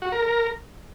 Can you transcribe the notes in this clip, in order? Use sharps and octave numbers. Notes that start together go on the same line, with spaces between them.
F#4
A#4
A#4